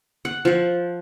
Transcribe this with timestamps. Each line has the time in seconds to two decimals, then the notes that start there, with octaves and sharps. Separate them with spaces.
0.25 F#5
0.45 F3 F#5